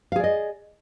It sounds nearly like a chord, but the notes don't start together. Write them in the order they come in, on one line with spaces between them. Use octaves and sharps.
F5 G#4 D5 D#5